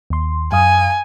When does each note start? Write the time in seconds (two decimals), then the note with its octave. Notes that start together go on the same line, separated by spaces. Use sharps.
0.10 D#2 C6
0.52 F#2 F5 G#5 D#6